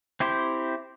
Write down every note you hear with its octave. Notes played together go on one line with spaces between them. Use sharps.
C4 E4 G4 C5